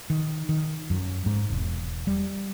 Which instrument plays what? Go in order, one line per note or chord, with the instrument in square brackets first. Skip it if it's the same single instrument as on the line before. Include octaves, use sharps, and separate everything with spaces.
[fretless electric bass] D#3
D#3
F#2
G#2
E1
G3